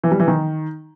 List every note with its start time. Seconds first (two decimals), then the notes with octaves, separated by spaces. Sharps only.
0.04 E3
0.12 G3
0.20 E3
0.28 D#3